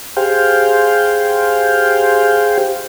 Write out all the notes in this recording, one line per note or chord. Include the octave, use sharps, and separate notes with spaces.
G4 G#4 C5 F5 G5